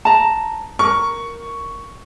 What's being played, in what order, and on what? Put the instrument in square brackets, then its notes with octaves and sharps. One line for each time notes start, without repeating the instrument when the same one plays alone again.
[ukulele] A5 A#5
[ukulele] A#4 [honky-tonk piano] C#6